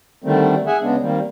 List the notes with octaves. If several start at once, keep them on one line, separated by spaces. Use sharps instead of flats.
D3 D#3 G3 A3 C4
G#4 E5 F#5 G#5
C#3 G#3 B3 D4
D#3 G3 A#3 C4